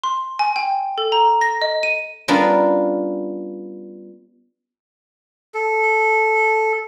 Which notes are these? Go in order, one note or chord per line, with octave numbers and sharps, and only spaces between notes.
C6
G#5
G5
A4
A#5
A#6
D#5
D#7
G3 B3 C#4 D4 F4 A#4
A4